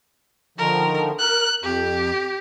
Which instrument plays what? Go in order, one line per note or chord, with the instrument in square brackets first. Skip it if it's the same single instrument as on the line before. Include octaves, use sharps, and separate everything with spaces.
[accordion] D3 D#3 F3 [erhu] A#4
[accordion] A#4 [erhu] F#6
[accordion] F2 [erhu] G4